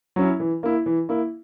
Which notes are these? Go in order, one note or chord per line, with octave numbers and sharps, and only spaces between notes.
F#3 C#4 E4
E3
A#3 E4
E3
A#3 E4